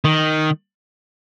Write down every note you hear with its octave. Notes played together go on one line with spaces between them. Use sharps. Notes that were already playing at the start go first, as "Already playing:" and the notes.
D#3